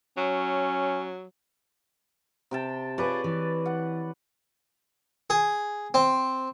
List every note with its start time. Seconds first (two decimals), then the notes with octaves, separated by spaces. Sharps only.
0.17 F#3 C#4
2.51 C3 G5 A5
2.98 F4 G#4 B4 C#5 D5
3.24 E3
3.66 F#5
5.30 G#4
5.94 C4